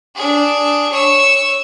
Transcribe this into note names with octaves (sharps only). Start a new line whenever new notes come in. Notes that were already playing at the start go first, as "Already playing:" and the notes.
D4 G#4
C#5 E6